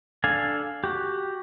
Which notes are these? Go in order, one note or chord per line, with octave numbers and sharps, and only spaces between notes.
D4 A4 F5 G#5
F#4 G4